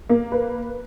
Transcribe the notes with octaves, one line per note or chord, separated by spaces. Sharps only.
A#3
B4